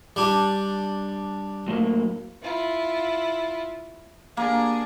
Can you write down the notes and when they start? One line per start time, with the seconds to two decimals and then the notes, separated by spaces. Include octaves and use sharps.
0.16 G3 D4
1.68 A2 F#3 A#3
2.43 E4 F4
4.37 A#3 D4 G#4